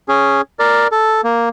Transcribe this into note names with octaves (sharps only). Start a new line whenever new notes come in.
C#4 G#4
A#4 D5
A4
A#3